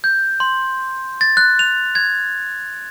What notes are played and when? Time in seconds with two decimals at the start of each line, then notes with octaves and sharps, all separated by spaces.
0.04 G6
0.40 C6
1.21 A6
1.37 F#6
1.59 F7
1.95 G#6